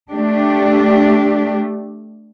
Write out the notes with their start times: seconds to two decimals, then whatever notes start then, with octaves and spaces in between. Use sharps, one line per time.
0.11 A3 D4 G4